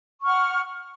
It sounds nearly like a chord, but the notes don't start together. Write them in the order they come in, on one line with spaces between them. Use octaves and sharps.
C#6 F6 F#5